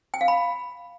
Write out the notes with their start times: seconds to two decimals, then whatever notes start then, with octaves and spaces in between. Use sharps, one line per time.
0.14 G5
0.21 F5
0.28 B5